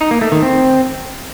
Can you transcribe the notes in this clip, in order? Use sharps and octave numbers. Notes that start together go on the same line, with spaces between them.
D#4
A#3
A3
D#3
C4